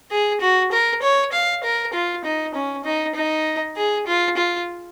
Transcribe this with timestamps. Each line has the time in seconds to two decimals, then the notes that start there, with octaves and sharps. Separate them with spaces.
0.11 G#4
0.41 F#4
0.72 A#4
1.02 C#5
1.32 F5
1.64 A#4
1.93 F4
2.25 D#4
2.54 C#4
2.85 D#4
3.15 D#4
3.76 G#4
4.07 F4
4.37 F4